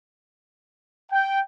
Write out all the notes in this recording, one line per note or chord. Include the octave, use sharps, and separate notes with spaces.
G5